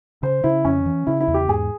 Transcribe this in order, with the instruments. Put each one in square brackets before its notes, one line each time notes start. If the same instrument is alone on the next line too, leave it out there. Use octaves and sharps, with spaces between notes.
[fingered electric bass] C#3 [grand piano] C5
[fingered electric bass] C#3 [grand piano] E4
[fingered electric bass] F2 [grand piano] C#4
[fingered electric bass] E3
[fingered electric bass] C#3 [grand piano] E4
[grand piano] E4
[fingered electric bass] E2
[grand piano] G4
[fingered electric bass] G#2 [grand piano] G#4